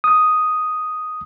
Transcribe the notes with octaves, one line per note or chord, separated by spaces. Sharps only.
D#6